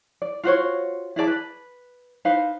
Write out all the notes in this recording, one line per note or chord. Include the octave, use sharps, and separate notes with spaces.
D5
F4 F#4 C5 C#5
E4 G#4 D5 A5
B4
D#4 B4 C5 F5